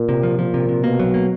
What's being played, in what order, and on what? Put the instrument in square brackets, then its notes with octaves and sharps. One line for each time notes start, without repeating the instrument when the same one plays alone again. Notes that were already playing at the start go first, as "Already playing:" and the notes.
Already playing: [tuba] A#2
[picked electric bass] C3
F3
[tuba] A#2 [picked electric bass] F3
[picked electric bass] C3
C3
[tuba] B2 [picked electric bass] A#3
[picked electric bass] F#3
A#3